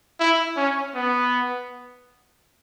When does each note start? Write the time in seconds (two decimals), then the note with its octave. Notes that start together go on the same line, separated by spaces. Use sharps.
0.19 E4
0.57 C#4
0.95 B3